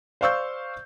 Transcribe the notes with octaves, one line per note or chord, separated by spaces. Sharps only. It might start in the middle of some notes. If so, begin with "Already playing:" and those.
C5 D5 F5 C#6 E6 G6